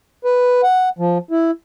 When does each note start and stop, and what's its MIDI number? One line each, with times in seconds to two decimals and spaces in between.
0.25 0.61 71
0.63 0.89 78
0.99 1.18 53
1.31 1.51 64